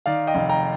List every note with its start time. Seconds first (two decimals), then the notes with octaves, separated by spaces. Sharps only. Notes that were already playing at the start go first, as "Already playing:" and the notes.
0.06 D#3 D5 F5
0.27 D#5 G5
0.35 F1
0.49 G5 A#5